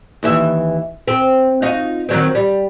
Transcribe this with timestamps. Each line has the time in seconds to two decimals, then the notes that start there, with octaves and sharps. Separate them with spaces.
0.23 D#2 E3 E5
1.08 C4
1.62 D#4 F4 F#4
2.09 D#3 F#3 C4
2.35 G3